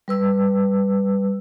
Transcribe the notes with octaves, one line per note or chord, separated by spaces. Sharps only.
G3 B4 E6